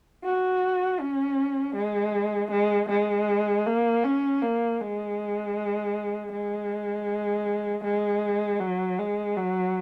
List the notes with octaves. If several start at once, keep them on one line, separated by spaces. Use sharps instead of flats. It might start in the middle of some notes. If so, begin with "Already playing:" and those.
F#4
C#4
G#3
G#3
G#3
A#3
C#4
A#3
G#3
G#3
G#3
F#3
G#3
F#3